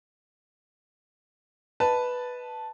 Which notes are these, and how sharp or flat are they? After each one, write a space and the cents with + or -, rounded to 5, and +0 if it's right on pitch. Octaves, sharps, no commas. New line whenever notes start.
B4 +0 D#5 +0 A5 +0